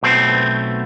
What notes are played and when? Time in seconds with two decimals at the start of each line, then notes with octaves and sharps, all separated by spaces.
0.03 B1 B2 A3 C4 C5